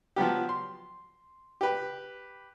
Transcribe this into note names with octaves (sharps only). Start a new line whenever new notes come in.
F3 F#3 B3 G4
C6
G4 B4